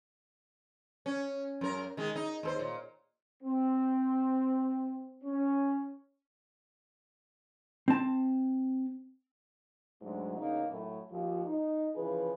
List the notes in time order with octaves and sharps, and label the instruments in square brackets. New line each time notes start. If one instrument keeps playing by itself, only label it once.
[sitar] C#4
F#2 A#4
D#3 G#3
D#4
D#2 A4 C5
A#2
[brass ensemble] C4
C#4
[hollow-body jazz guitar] C4 A5
[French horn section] D2 G#2 F#3
E2 C#3 A#3 D#4
F#2 A2
D#2 F3
D#4
C#3 E3 F3 G#4 B4